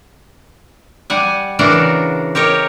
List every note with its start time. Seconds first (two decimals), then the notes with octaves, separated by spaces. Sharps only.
1.10 G3 F#5 G#5
1.59 C#3 E3 D4 F#4 A#4 F#5
2.35 G4 A#4 C#5 D#5